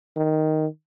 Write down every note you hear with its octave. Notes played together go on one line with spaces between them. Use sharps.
D#3